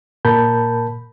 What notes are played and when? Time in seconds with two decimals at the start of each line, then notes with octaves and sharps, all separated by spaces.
0.25 A#2 A#4 A5 B5 G6